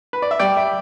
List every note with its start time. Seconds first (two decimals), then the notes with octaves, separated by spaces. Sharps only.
0.13 B4
0.22 D5
0.31 E5
0.39 G3 D5 G5
0.57 E5